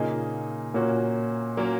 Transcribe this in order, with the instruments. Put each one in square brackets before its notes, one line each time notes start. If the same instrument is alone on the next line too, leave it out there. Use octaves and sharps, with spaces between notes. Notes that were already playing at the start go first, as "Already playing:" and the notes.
Already playing: [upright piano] A#2 [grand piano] C#3 A#3 D#4 G#4 D#5
[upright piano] A#2 [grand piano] A#3 C#4 F#4
[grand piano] F#3 A#3 C#4 A#4 C#5